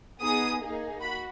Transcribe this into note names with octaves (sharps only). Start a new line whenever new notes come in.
B3 D#4 G#4 D#6
A#3 D#4 G#4
F#4 B5